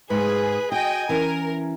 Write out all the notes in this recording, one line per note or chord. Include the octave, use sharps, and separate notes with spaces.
G#2 G#4 B4
F#4 G#4 D#5 G5 G#5
E3 C#4 A#4